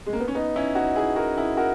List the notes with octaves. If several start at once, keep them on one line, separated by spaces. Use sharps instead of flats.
G#3
A#3
B3
C#4
B3 D#4
C#4 E4
D#4 F#4
E4 G#4
F#4 A#4
E4 G#4
F#4 A#4